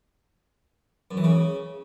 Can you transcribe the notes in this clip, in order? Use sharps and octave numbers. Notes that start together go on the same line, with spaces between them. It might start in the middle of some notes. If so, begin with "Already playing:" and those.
F#2
E3
C#3